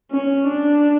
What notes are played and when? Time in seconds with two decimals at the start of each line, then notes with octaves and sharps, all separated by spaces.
0.11 C#4
0.48 D4